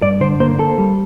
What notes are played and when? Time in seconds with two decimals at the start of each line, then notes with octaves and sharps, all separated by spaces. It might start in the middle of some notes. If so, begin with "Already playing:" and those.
0.02 G2 D5
0.20 D3 C5
0.40 A#3 C5
0.59 A#3 A4
0.78 G3